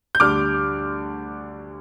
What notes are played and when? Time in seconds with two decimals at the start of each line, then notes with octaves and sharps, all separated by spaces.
0.15 G6
0.20 D2 D3 G3 D6 F6